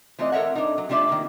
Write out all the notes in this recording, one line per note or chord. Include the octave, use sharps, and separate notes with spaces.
E3 A3 C4 F4 D5 D#5
A4 A#4 C#5 E5 F#5
D4 D#4
F#3
G3 A3 D4 F4 D5 E5
D#3 A#3